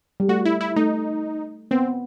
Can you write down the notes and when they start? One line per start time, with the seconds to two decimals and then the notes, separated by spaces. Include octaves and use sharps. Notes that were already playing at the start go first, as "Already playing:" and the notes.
0.20 G3
0.29 A3 F#4
0.45 E4
0.61 E4
0.76 A3 D#4
1.71 B3 C4